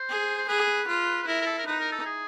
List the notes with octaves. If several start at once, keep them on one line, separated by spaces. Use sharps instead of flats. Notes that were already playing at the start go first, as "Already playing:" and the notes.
Already playing: C5
G#4
C5
G#4 B4
F4
B4
E4 A#4
A#4
A4
A#4
D#4 B4
A#4
A4
G#4